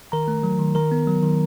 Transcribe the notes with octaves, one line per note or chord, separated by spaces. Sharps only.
D#3 A#4 A#5
A3
F#3
D#3
D#3 A#4 A#5
B3
F#3
D#3